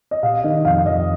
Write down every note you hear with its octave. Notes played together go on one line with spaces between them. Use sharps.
D#5
C3 F5
D#3 D#5
F2 F5
F2 D#5